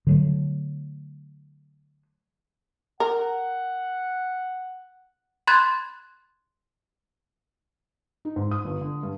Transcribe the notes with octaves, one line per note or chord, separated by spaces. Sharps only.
D3 F#3 A3
A#4 F#5
B5 C6 F#6 G#6 A6
D#4
G#2
D#6
G1
D3
G2